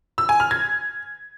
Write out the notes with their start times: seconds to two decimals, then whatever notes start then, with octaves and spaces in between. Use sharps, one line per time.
0.18 E6
0.29 G#5
0.40 F6
0.51 G#6